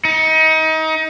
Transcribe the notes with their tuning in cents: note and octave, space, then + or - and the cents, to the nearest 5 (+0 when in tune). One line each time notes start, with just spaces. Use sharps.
D#4 +30